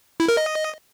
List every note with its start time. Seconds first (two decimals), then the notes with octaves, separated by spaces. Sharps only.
0.20 E4
0.28 A#4
0.37 D#5